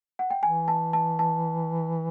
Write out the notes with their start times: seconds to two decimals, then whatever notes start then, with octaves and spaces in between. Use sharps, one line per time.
0.19 F#5
0.30 G5
0.43 E3 G#5
0.68 A5
0.93 A5
1.19 A5